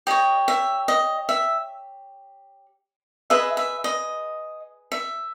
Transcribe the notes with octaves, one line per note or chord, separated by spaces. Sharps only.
G4 C#5 D#5
E5
D#5
E5
G#4 B4 D#5 E5
E5
D#5
E5